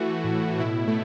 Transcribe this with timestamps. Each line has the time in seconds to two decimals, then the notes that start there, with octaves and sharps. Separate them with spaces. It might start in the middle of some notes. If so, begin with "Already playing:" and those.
Already playing: E3 A3 F#4
0.24 A2
0.59 B2 E4
0.88 A3